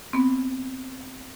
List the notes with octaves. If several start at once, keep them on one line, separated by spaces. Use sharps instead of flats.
B3 C4